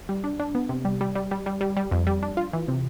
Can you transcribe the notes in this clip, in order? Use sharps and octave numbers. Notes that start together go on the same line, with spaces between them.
G3
D4
D4
B3
C3
G3
G3
G3
G3
G3
G3
G3
F2
G3
D4
F4
E3
C3